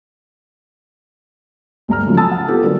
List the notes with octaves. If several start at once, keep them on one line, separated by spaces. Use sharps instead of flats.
D2 G2 A#5 F6
C#3 F3 F#3 G#3 A3
G#5 A5 B5 D#6 E6 A6
F#5
B3 C4 D#4 F4 G4 A4
D3 F#3 G3 A#3